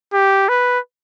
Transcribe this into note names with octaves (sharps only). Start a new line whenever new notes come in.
G4
B4